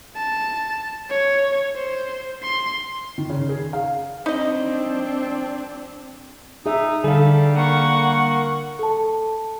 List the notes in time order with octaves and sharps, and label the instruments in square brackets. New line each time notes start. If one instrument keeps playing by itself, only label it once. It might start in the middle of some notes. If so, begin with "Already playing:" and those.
[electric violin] A5
C#5
C5
C6
[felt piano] D#3
C#3
G#4
F5
[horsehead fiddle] C4 D4 [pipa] D#4 D#5
[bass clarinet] D#4 [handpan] G#4 E5
[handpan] D3 F5 [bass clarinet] G3 [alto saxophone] A4
[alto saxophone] A#3 [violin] F#5 C#6
[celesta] A4 A5